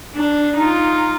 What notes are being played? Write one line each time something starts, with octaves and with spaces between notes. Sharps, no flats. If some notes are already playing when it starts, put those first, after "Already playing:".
D4
D#4 F4